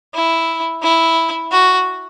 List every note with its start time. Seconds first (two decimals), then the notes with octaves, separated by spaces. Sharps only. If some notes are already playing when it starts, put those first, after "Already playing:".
0.14 E4
0.83 E4
1.52 F#4